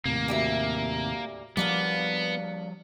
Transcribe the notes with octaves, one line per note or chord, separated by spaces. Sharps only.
D#2 A2 C3 A#3
D2 G3 E5
F3 G3 A#3 B3 D4 F5